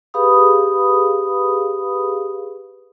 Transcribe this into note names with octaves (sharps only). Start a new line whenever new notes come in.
G4 G#4 B4 F5 B5 D#6